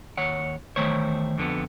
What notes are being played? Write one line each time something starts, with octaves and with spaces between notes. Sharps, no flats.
D#2 C#5 F#5
E2 D#3 A3 C5 C#5
F2 D3 B3